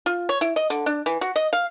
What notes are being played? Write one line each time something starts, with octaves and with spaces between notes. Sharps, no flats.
F4
C#5
E4
D#5
D3
D4
E3
F#4
D#5
F5